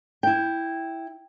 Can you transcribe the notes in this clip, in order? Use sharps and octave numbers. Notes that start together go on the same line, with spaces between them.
E4 G5